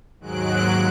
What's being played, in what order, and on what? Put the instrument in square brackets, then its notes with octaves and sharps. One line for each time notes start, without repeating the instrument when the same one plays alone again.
[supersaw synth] D#2 G#2 F#3 G#3 F#6 D7